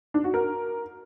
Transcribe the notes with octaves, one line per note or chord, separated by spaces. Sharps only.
D4
F#4
A#4